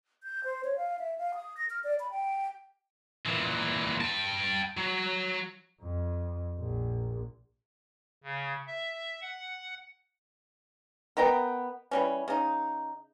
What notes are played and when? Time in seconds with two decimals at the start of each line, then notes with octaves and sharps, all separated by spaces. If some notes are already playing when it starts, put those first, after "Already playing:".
0.23 G6
0.44 C5
0.64 C#5
0.77 F5
0.99 E5
1.18 F5
1.35 D#6
1.57 A#6
1.70 F6
1.84 D5
2.00 B5
2.11 G5
3.26 A#2 E3
4.01 G5 A5
4.77 F#3
5.81 F2
6.58 A#1
8.24 C#3
8.67 E5
9.21 F#5
11.17 B3 A#4 D#5 G5
11.91 E3 G3 C#4
12.28 C#3 D#4